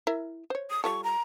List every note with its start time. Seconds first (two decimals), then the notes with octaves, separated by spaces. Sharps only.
0.07 E4 A#4 E5
0.50 C5 C#5
0.70 D#6
0.84 G3 F4 A4 C#6
1.04 A#5